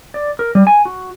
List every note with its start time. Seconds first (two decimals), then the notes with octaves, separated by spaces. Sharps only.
0.14 D5
0.39 A#4
0.55 G3
0.67 G#5
0.85 F#4